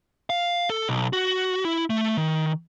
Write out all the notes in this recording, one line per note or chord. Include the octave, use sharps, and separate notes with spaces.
F5
A4
B1
F#4
E4
A3
D#3